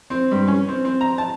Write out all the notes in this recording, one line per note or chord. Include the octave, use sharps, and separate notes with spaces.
C4
G2
C#4
C4
C4
A#5
A5